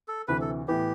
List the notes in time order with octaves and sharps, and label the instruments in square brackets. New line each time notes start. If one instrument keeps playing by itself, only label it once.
[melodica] A4
[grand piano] D2 C3 E3 [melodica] B4
[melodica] A4
[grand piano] A2 E3 B3 [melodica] G4